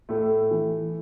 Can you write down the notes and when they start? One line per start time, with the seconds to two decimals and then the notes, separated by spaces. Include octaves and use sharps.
0.09 A2 A3
0.51 E3